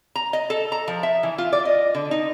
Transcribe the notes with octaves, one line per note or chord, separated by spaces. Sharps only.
A#5
D#5
A4
A#5
F3
E5
E3
F4
D5
D#5
D3
D#4